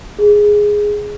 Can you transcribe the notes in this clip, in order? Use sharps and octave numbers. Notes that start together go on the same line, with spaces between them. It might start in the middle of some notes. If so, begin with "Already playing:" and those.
G#4